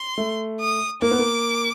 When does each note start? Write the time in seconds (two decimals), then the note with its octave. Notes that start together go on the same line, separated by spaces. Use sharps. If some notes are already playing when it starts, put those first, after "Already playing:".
Already playing: C6
0.18 A3
0.61 D#6
1.02 A#3 D6
1.11 B3
1.19 A#3